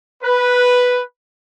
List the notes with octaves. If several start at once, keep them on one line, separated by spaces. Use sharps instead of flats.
B4